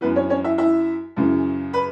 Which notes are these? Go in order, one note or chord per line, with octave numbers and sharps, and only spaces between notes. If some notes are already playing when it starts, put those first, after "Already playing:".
F#2 E3 B3 B4
C#4 C#5
C#4 C#5
E4 E5
E4 E5
F#2 C#3 E3
B4 B5